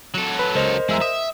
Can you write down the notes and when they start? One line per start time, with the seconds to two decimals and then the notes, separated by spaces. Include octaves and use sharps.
0.14 F#3 A4
0.39 B4
0.55 C#2 A#4 C5 D#5
0.89 E2 G#3 E5 A#5
1.01 E5 D#6